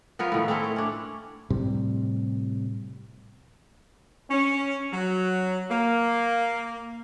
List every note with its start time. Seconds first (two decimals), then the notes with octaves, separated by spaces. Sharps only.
0.19 F3 B3 A#4 C#5
0.32 A2 D#3 A3
0.48 A3 C4 C#4 E4
0.64 C#5
0.76 C#4 D4
1.50 A2 C3 G3
4.30 C#4
4.93 F#3
5.71 A#3